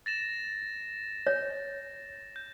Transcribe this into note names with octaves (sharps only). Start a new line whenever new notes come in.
A6 A#6 E7
C#5
G6